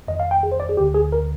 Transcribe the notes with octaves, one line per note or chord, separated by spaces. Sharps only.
F2 D#3 D#5
F5
G5
G#4
C5
D5
G#4
D2 D3 G4
G#4
A#4